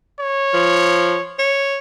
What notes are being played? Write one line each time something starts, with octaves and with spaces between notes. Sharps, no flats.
C#5
F3
C#5